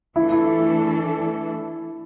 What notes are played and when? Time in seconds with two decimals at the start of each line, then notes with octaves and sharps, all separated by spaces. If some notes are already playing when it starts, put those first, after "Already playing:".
0.16 E3 A3 D4 E4 A4
0.32 E4